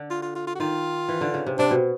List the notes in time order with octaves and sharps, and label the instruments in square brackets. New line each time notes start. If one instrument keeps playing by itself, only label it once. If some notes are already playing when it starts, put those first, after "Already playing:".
Already playing: [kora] D3
[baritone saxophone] F4
F4
F4
F4
F#4
[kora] D#3 [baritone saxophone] F4
[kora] E3
D3
C#3
C3
[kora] C3 [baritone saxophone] D4
[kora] B2